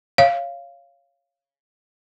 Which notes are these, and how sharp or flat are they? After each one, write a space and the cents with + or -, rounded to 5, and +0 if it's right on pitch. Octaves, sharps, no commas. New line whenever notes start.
C#5 +0 F5 -15